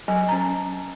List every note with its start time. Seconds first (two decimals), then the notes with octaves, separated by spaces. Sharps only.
0.08 F#3 G#5
0.28 C#4 A#5